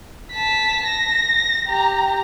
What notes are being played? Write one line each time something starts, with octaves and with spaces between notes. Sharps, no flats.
A5 B6
A#6
G4 A#5